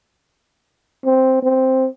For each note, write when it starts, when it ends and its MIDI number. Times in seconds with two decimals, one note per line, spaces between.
1.06 1.42 60
1.43 1.89 60